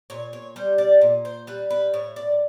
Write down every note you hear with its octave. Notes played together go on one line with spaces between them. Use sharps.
A#2 C#5
C#5
G3 C5
D5
A#2
C5
G3 B4
B4
A2 C#5
D5